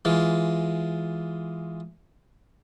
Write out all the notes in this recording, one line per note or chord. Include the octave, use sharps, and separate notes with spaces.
E3 G#3 F4